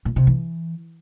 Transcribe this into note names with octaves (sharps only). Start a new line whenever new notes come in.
A#2
C3
E3